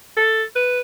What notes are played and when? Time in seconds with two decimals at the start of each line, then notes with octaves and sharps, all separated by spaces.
0.17 A4
0.55 B4